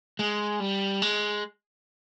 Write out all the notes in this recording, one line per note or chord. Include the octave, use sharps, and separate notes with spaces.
G#3
G3
G#3